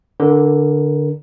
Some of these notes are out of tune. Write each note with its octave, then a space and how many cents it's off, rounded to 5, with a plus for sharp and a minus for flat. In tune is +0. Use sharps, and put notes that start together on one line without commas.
D3 +0 A#4 +25